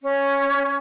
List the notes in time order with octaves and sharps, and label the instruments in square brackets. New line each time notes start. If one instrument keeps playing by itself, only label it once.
[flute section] C#4